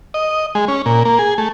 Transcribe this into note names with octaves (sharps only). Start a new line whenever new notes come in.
D#5
G#3
C#4
A#2
A#3
G#4
A3